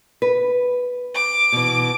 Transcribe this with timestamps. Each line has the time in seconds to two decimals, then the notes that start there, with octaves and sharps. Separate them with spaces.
0.22 B4
1.14 D6
1.52 B2 E3